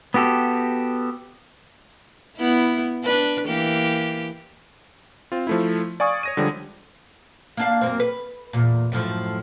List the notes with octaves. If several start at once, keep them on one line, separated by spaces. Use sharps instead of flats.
B3 F#4 G4 A4
B3 E4
D4 B4
E3 A#3 G4
C4 F4
F3 A3 E4
D5 F5 G#5 C#6 D#6 G#6
C#5 A#6 D#7
D3 F3 G3 G#3
A#3 D4 F5
F#2 A#3 C4
B4
E2 A#2
F#2 A2 F3